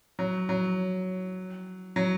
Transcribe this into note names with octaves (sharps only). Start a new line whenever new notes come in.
F#3
F#3
F#3